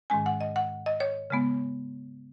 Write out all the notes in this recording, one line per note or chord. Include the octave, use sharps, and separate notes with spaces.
G#2 D#3 G#3 C#4 G#5
F#5
D#5
F#5
D#5
C#5
C#3 G#3 B3